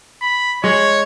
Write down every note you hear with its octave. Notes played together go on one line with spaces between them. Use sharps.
B5
G#3 C#5